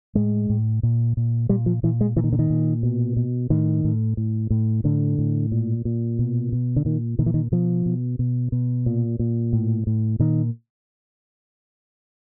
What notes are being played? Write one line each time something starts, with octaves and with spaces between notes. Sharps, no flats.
A2 G#3
A2
A#2
A#2
A#2 G3
F3
A#2 E3
G#3
A#2 E3
D#3
D3
D#3
A#2
B2
B2
A2 D#3
A2
A2
A2
A2 D3
A2
A#2
A#2
B2
B2
D3
A#2 D#3
A#2 D#3
E3
D#3
B2 F3
B2
B2
B2
A#2
A#2
A2
A2
A#2 D#3